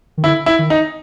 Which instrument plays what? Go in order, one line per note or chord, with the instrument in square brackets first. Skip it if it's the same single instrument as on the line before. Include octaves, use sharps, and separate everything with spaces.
[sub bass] D#3
[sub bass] D3 [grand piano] E4
[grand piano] E4
[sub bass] D#3
[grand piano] D#4